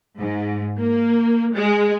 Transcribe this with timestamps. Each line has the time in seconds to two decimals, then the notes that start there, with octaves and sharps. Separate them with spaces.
0.19 G#2
0.78 A#3
1.55 G#3